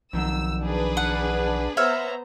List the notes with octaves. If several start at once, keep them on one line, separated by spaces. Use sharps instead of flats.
B1 F2 D#3 F#3 E6
D4 G#4 B4
F#5
B3 C5 C#5 E5 A#5 F6